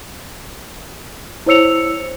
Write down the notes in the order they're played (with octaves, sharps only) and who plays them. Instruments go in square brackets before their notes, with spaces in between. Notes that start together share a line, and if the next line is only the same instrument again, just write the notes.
[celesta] E4 C5 C#5 E6 C#7 F7